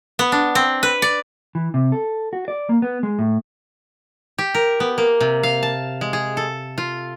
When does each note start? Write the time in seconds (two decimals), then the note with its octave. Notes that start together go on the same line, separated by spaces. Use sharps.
0.19 B3
0.32 D4
0.55 C4
0.83 B4
1.02 D5
1.55 E3
1.74 C3
1.92 A4
2.33 F#4
2.48 D5
2.69 A#3
2.82 B3
3.03 G#3
3.19 A2
4.38 G4
4.55 A#4
4.80 B3
4.98 A#3
5.21 C3
5.43 F5
5.63 A5
6.01 G#3
6.13 G#4
6.37 A4
6.78 F4